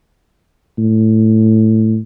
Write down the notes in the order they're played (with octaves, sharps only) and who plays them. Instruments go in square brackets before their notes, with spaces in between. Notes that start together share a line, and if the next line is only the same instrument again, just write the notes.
[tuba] A2